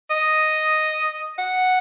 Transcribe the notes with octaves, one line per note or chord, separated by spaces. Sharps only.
D#5
F#5